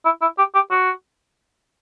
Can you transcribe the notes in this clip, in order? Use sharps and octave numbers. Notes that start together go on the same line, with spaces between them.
E4
E4
G4
G4
F#4